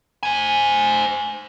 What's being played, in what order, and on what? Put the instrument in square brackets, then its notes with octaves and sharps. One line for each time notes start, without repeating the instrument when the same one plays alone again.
[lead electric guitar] C5 G#5